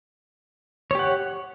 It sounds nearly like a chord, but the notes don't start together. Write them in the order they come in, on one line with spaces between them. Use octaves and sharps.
C#5 G4 F#5